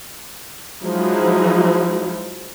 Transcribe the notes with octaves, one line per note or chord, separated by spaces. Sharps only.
F3 F#3 G#3 D#4 E4